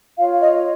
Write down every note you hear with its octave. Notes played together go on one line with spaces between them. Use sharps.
F4 C#5 F5
D#5